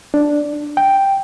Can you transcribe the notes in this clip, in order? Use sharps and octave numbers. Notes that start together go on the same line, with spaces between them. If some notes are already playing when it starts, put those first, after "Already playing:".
D4
G5